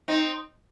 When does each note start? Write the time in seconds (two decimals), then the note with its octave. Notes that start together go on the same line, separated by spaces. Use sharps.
0.08 C4 D#4